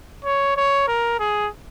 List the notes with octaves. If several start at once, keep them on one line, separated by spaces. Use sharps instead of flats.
C#5
C#5
A#4
G#4